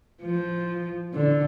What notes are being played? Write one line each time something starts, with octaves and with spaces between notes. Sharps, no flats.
F3
D3